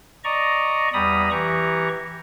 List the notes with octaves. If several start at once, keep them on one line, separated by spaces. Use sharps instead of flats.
D5 D#5 A#5 C#6
E2 G3 A#5 B5 D#6
E3 G4 A#5 C#6